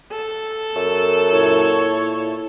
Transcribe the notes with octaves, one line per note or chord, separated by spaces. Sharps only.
A4
F#2
A#2 E4 C#5